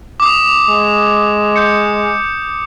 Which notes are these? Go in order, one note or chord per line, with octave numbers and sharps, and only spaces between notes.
D6 D#6
G#3
G6 C#7